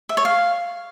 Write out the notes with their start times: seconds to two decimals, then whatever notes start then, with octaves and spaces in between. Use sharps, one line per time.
0.09 E5
0.17 C#5
0.25 F5